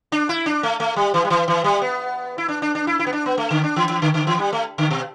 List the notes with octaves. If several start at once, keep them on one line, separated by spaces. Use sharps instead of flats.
D4
E4
D4
A3
A3
G3
E3
G3
E3
E3
G3
B3
E4
D4
D4
D4
E4
E4
B3
D4
B3
A3
D3
D4
E3
E3
D3
D3
E3
G3
A3
D3
B2